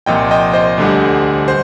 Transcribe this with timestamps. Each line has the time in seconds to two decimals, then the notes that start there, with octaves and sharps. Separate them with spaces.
0.06 C2 A#2 F3 D#5 G5
0.31 D#5 G5
0.54 C5 D#5
0.78 D2 D3 G3
1.48 C5